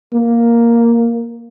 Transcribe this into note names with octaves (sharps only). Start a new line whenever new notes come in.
A#3